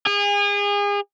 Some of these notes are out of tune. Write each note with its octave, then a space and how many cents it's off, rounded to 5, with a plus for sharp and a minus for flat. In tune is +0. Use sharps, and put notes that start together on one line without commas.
G#4 -35